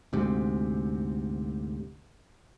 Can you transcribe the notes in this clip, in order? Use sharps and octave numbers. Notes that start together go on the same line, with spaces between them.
D2 G#2 C3